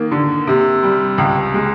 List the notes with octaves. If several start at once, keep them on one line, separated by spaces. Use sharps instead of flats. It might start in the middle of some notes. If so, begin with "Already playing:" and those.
Already playing: D#3 A#3
D3
C3
G3
C#2
G#3